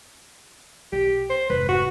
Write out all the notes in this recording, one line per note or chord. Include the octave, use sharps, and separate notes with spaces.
B1 G4
C5
F1 G#2 B4
F#4